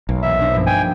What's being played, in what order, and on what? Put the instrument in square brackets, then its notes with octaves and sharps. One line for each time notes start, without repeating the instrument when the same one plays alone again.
[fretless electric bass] B1 [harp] A#3
[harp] A#1 E2 [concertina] E5
[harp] D4 D#4 C5
G2 F3 A#3
[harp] G#4 [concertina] G5 G#5
[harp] G6